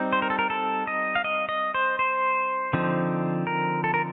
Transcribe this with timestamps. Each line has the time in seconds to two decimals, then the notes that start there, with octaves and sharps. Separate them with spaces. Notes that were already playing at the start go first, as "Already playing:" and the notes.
Already playing: G3 C4 D#4
0.13 C5
0.22 A#4
0.30 A4
0.39 A#4
0.50 A4
0.87 D#5
1.15 F5
1.24 D#5
1.49 D#5
1.74 C5
1.99 C5
2.73 D3 F3 C4 D#4
3.47 A#4
3.84 A4
3.94 A#4